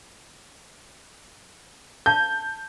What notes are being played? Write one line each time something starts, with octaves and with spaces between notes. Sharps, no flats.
F5 A5 G6